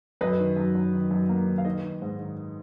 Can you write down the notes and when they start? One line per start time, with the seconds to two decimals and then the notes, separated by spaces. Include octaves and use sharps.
0.21 F#2 B4 D#5
0.39 D#3
0.57 F#2
0.75 F#2
0.93 D#3
1.11 F#2
1.29 A#3
1.47 D#3
1.58 F5
1.65 D#3 B4 D#5
1.83 D#3
2.02 G#2
2.19 D#3